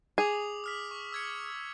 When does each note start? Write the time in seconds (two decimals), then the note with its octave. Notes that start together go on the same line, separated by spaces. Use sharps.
0.18 G#4 D6 D#6 F7
0.64 D#6 F6 B6
0.91 C#6
1.12 E6 G#6 C#7